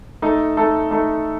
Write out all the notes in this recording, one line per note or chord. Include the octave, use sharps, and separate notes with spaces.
A3 D#4 A4
A3 D#4 A4
A3 D#4 A4